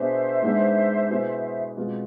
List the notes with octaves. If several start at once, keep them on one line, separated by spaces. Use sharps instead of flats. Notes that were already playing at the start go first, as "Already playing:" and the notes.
Already playing: B2 B3 D4 G#4 C5 E5
G#2 G#3 B3 D4
B2 B3 E4 G#4
B2 G#3 C4 F4